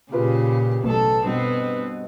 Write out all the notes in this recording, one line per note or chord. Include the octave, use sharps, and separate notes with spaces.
A#2 C#3 F4 G4 G#4 B4
A1 B2 F#3 A4
G2 B2 B3 C4